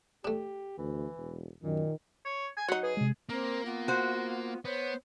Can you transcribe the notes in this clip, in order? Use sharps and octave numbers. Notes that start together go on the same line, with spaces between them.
A3 D4 G4
D2 E3
E1
F#2 A#2 D#3
C#5
G#5
F#3 D#4 F#5
G#4 B4
C3 G#3
A#3 C4 A#4
B3 F4
F#4 C5
B3 C5 C#5